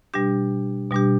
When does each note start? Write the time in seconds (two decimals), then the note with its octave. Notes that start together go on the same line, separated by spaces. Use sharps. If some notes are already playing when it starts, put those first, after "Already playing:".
0.14 B2 G3 D4 G4
0.91 B2 G3 D4 G4